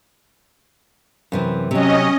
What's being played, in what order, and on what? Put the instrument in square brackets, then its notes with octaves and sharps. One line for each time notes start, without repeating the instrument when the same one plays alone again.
[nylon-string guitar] F#2 C3 E3
[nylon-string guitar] C3 F#3 [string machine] C#4 D#5